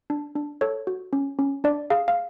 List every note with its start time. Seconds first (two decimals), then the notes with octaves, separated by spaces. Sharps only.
0.10 D4
0.36 D4
0.61 A4 C#5
0.87 F#4
1.13 C#4
1.39 C#4
1.64 D4 D5
1.90 G#4 F5
2.08 F5